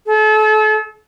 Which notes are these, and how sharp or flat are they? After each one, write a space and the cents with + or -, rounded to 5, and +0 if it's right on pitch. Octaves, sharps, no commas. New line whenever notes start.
A4 -35